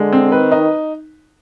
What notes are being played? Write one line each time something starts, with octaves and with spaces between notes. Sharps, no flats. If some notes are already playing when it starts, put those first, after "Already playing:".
Already playing: D3 G#3
C4
D#3 B4
D#4